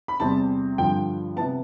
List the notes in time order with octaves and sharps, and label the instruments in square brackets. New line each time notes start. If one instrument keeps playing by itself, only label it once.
[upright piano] B5
E2 C3 G3 C4 A5
G2 D3 F3 G5
C3 E3 B3 A5